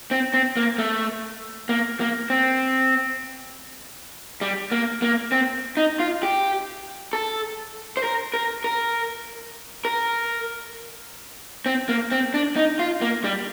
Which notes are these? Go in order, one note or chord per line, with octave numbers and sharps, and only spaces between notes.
C4
C4
A#3
A3
A#3
A#3
C4
G3
A#3
A#3
C4
D#4
F4
G4
A4
C5
A#4
A#4
A#4
A#4
C4
A#3
C4
D4
D#4
F4
A#3
G3